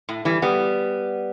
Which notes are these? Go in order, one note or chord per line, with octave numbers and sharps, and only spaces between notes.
A2
E3 G3
G3 B3